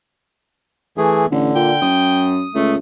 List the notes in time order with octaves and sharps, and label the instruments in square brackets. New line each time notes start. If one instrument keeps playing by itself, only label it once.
[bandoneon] E3 A3 G#4
[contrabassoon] A1 [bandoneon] D3
[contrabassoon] A#2 [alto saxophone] G5
[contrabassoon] F#2 [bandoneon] D#6
[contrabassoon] C#2 [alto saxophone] A3